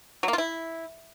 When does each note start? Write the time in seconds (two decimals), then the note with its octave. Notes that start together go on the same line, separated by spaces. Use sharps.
0.23 F#3
0.28 A#3
0.33 F4
0.38 E4